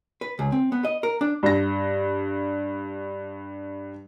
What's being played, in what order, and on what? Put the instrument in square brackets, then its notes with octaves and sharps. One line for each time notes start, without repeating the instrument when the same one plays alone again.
[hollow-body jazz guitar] B4
C#2
C4
B3
D#5
A#4
D4
[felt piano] G2 A#6